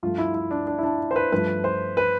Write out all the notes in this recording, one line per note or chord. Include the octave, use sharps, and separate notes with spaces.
G2 F3 A3 F4
E4
E4
D4
D4
E4
D4
C5
B4
G2 F3 A3 B4
C5
B4